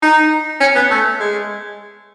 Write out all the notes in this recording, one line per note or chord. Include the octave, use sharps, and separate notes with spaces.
D#4
C#4
B3
A3
G#3